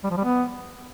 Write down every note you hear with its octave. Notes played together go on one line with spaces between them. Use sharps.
G3
F3
G3
B3